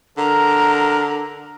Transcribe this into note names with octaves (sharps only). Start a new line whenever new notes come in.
D3 A#4 A#5